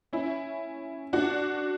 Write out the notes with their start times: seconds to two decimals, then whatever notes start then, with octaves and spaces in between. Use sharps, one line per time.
0.13 C#4 E4
1.13 D4 F#4